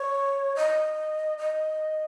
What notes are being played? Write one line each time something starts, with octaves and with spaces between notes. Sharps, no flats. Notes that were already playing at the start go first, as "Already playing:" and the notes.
Already playing: C#5
D#5
D#5